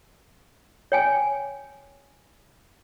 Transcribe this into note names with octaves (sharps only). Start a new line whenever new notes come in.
C#5 G5 G#5